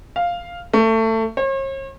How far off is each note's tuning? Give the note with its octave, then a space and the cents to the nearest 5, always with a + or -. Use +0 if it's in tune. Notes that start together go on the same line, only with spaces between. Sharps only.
F5 +0
A3 +25
C#5 -45